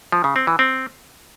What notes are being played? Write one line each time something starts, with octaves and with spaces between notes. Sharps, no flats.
F3
C#3
C4
E3
C4